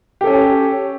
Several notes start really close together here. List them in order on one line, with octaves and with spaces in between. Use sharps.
G4 A4 C#4